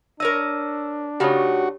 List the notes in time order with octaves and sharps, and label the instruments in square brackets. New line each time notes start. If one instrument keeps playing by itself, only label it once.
[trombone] D4 [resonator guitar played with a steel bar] A#4 C#5 D#5 [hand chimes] E6
[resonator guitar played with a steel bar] C#3 A3 D#4 [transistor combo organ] F#4 [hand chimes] G4 C#5